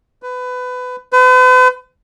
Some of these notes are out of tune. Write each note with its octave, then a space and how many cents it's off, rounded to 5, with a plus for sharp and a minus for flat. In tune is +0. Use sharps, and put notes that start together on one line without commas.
B4 +20
B4 +45